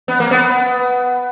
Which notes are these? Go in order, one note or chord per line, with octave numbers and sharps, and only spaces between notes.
B3
A#3
B3